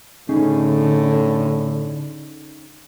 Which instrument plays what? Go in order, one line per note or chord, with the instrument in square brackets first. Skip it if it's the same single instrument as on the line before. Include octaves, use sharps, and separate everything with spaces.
[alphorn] A2 [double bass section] D3 [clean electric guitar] C#4 D#4 G#4